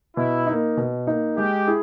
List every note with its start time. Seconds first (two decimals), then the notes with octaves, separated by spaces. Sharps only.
0.17 B2 E4
0.47 A#3 D#4
0.77 B2
1.07 A#3 D#4
1.37 G#3 G4
1.67 E4 G#4